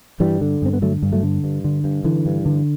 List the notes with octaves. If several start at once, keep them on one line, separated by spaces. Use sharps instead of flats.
G2 E3 G3
D3
G2 C4
B3
D3 F#3 A3
G2
F#3 A3
D3
G2
D3
G2
D3 E3
G2
D3